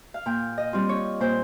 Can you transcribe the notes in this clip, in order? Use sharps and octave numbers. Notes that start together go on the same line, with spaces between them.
F5
A#2 G5
D#5
G3 C4 F4
C#5
A#2 C5